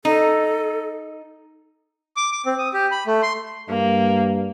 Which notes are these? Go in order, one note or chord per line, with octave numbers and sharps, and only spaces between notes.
D#4 A4
D6
D6
C4
D#6
G4
B5
A3
C6
G2 A#3